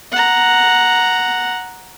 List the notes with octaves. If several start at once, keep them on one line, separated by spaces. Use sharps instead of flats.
F#5 A#5